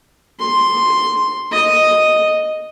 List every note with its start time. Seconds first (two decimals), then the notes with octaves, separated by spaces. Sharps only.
0.39 C6
1.51 D#5